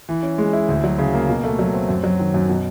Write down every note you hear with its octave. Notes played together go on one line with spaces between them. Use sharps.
E3
C#4
G#3
E4
D2
F#3
C#3
A#3
B2
A3
F#3
C4
F#2
F#3
D#3
F#2
B2